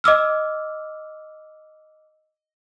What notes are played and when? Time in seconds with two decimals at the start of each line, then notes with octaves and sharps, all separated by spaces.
0.04 D#5 D6 E6 F6